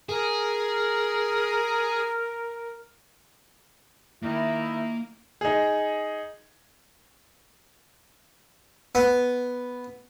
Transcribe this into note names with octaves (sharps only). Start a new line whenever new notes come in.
G#4 A#4
D#3 A#3 E4
D#4 G#4
B3